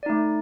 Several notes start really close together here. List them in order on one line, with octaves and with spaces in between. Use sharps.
D5 D#4 A3